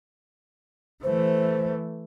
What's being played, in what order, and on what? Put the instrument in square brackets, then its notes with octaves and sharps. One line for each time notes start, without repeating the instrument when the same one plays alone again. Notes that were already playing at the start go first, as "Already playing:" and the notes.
[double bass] E3 A3 [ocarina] C5